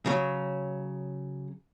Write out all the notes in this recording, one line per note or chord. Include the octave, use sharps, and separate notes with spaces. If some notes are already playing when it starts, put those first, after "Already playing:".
C#3 F#3